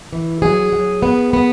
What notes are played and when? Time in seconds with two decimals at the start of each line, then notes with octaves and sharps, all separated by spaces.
0.13 E3
0.42 F#3 G#4
0.73 F#3
1.02 B3
1.33 B3